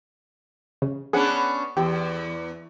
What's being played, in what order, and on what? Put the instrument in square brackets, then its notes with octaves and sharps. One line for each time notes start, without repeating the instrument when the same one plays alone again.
[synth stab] C#3
[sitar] B3 C#4 D4 [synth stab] G#4 F#5
[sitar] E2 [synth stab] G4